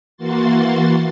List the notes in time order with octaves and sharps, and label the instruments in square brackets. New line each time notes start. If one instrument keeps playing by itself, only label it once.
[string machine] E3 A#3 F#4 C6 A6